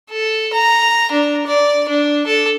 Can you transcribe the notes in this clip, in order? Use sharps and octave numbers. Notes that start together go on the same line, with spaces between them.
A4
A#5
D4
D5
D4
A4